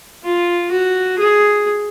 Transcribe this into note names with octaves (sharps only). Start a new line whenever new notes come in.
F4
F#4
G#4